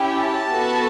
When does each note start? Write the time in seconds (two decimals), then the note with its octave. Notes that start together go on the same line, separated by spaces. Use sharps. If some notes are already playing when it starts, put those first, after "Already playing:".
Already playing: C#4 E4 G4
0.14 A5
0.50 B3 F#4 A4